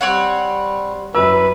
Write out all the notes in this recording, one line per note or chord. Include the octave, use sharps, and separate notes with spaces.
G3 C4 C#5 F#5
F#2 B4 E6